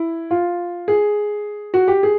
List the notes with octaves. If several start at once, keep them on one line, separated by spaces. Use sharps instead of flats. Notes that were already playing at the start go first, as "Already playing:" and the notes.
Already playing: E4
F4
G#4
F#4
G4
G#4